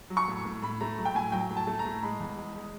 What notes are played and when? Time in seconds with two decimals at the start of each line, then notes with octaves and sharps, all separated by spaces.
0.10 F#3
0.17 C#6
0.28 A2
0.45 A2
0.62 A2 B5
0.81 A3 A#5
0.98 F#3
1.05 G5
1.15 A2 G#5
1.32 F#3 G5
1.50 A2
1.56 A5
1.67 A3
1.79 A#5
1.85 A2
2.03 G#3 B5
2.20 E2
2.38 G#3
2.56 G#3